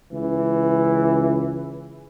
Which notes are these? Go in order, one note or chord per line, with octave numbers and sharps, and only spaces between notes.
C#2 E3